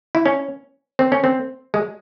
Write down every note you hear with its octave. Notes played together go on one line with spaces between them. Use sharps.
E4
C#4
C4
C#4
C4
G#3